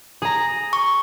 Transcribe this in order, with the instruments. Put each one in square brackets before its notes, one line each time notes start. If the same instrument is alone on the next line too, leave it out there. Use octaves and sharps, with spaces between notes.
[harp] G#4 A#5
[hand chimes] C#6